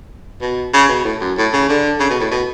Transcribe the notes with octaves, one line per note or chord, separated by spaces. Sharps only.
B2
C#3
B2
A2
F#2
A2
C#3
D3
C#3
B2
A2
B2